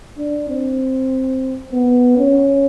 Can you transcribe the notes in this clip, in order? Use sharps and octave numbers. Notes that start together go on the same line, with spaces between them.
D4
C4
B3
C#4